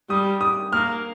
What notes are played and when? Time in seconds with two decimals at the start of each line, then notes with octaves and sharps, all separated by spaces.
0.10 G3 D#6
0.41 D#6
0.72 A#3 F6